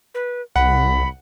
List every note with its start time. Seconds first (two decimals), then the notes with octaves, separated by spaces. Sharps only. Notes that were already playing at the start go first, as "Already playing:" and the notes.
0.15 B4
0.56 C2 F#5 B5